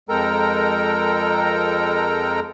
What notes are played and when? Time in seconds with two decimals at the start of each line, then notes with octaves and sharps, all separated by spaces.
0.09 F2 G#3 A4 A#4 G5 A#5